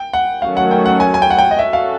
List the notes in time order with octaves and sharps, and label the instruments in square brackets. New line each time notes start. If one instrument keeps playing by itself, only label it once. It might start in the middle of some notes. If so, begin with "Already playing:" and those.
Already playing: [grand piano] G5
F#5
[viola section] D#3 F#3 A3 C#4 F#4 [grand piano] F5
[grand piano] F#5
G5
F#5
G#5
G#5
G5
F#5
G5
D#5
[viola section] C#4 F#4 A4 [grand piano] E5
[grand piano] F5